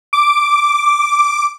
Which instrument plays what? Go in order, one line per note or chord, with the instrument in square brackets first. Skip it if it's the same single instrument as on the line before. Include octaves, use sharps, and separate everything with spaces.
[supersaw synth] D6